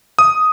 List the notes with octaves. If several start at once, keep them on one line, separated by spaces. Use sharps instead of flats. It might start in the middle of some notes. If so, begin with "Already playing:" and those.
D#6